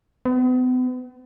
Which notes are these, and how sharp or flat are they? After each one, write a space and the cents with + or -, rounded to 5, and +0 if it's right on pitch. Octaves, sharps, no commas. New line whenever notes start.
B3 +40